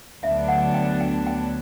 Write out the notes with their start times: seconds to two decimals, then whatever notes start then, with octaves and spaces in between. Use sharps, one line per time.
0.23 D2 D3 F#3 B3 D4 E5
0.48 F#5
0.74 G5
1.01 G5
1.27 G5